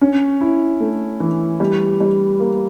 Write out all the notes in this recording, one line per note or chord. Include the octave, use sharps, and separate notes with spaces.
C#4
E4
A3
E3
G3
G3
A#3